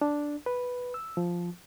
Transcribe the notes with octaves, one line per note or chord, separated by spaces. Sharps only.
D4
B4
E6
F3